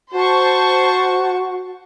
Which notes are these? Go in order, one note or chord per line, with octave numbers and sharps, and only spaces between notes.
F#4 C5 A5 C#6